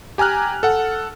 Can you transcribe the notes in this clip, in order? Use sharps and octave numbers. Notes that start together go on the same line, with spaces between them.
G4 G#5 A#5 F6 F#6
A4 F#5